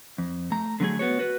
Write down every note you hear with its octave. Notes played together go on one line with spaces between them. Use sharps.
F2
A3 A#5
D3 F#3 A3 G#4
B3 F#4 C#5
F#4 B4